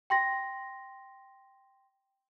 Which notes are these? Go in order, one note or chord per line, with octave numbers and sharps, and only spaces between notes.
G5 C6 A#6